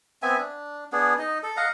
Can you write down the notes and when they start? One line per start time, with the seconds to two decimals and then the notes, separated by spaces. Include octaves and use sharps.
0.23 B3 C4 E5 G#5
0.38 D4
0.92 B3 D4 G#4
1.19 D#4 D#5
1.43 A4
1.57 D#5 F5 F#5 A#5